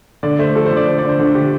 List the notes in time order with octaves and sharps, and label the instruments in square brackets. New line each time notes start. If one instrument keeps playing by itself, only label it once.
[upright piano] D3 D5
A3 C5
F3 A4
C5
D3
D5
D3 C5
D5
D3
C5
D3 D4
D3 G4